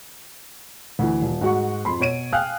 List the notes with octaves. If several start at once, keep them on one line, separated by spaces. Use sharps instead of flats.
D2 E3
D#1
G#2 F#4 F#5 C#6
F2 B5 C6
B2 C#5 D7 D#7
F5 G5 G#5 D#6 F6 F#6